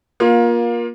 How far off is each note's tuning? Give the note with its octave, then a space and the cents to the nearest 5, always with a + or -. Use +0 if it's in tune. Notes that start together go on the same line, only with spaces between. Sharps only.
A#3 +25 F4 +20